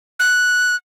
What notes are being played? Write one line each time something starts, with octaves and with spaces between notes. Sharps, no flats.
F#6